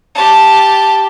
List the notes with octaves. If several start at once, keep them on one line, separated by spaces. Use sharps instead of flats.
G4 A5